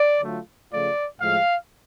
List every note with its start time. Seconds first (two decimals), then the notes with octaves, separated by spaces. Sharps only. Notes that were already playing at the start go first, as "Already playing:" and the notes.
Already playing: D5
0.21 D3 F#3 A3 F4
0.71 C#3 F3 A3 F4 D5
1.21 A2 F3 G#3 F5